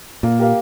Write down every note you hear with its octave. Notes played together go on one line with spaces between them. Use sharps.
A#2 A#3
G4 A#4 F5